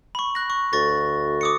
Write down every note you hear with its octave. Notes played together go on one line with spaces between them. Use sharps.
B5 C#6
F#6 A#6
C#6
D2 C#6 A6 A#6
D6 D#6 C#7